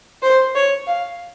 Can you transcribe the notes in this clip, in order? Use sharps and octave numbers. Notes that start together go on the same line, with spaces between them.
C5
C#5
F5